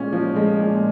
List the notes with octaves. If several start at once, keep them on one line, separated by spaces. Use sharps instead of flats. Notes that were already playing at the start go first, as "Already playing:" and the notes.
Already playing: A#2 G#3 C#4
F3
G#3
A#2